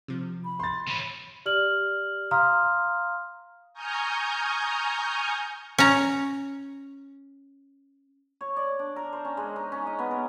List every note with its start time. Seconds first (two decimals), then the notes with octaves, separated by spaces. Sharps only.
0.08 C3 F3
0.44 B5
0.60 C6 A6
0.88 E3 C#4 B5
1.46 G4 D5 F6 F#7
2.31 F5 A#5 C6 D#6 F6
3.74 G#5 A#5 C#6 D#6 F6 G6
5.78 C#4 A#5
8.41 C#5
8.56 D5
8.79 D4
8.96 A#4
9.13 C5
9.25 C#4
9.37 G#3
9.56 D#4
9.72 C#4
9.87 D#5
9.99 B3
10.11 A#4